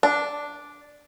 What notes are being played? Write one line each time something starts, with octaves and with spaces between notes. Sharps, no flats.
D4